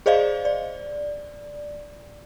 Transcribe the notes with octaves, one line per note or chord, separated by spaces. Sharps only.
G#4 C5 D5 D#5 F5
D5